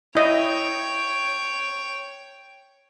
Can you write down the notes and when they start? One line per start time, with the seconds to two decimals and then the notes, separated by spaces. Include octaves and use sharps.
0.15 E4 C#5 D#5 G5